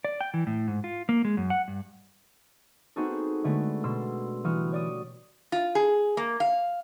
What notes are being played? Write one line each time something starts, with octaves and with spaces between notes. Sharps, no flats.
D5
G5
E3
A2
G#2
F4
A#3
G#3
F#2
F#5
G2
B3 C4 D#4 F#4 G#4 A4
D3 G#3 A3 B3
B2 C6 E6
E3 G3 F#4 D#6 F6 E7
C#5 D5 D#6
F4
G#4
A#3
F5